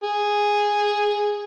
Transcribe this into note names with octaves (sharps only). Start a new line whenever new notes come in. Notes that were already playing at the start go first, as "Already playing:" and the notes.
G#4